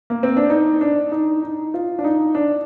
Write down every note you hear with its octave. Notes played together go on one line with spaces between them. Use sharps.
A#3
C4
D4
D#4
D4
D#4
D#4
F4
D4
D#4
D4